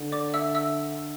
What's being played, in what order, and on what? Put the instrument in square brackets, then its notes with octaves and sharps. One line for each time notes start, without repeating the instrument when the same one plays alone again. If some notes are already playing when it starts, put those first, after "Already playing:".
Already playing: [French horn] D3
[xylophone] D5 D6
E5 E6
E5 E6